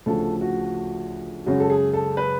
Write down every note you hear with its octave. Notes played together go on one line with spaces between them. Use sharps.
D2 C#3 F3 A3 A4
F#4
F#2 C#3 G#3 C#4 F#4
A4
G#4
A4
B4